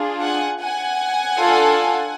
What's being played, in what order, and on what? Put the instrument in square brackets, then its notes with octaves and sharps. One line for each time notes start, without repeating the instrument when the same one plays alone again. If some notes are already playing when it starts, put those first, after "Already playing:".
Already playing: [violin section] D4 F4 G#4
F#5 G#5
F#5 G#5
D4 F4 A4